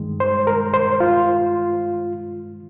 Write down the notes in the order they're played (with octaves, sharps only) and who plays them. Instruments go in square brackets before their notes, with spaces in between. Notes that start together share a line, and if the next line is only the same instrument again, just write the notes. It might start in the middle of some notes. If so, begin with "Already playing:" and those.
Already playing: [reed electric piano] G2 D#3 G#3
C5
A#4
C5
F4